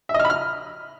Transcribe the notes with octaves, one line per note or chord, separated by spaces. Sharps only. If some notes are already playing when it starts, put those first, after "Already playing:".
E5
D#5
F6
B5
F6